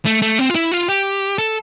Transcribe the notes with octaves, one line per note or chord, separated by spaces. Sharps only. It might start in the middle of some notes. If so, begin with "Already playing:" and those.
A3
A3
C4
F4
E4
F4
G4
A4